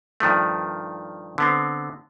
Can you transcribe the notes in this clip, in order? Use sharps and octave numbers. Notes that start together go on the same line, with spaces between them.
G2 D#3 F3 A3
D3 B3 C4